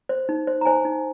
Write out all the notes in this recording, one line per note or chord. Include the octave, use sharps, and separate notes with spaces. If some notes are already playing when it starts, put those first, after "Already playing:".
C5
D#4
C5
A#5
C5 G#5
D#4